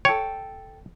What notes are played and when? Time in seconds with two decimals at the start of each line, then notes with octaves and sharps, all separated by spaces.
0.05 A4 C#5 G5